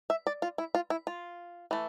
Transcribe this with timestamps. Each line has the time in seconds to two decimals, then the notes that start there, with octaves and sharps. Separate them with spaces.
0.10 E5
0.27 D5
0.42 F4
0.58 E4
0.75 F4
0.90 E4
1.07 F4
1.71 E3 A3